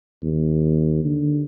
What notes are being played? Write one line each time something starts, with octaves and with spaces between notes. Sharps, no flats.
D#2
D3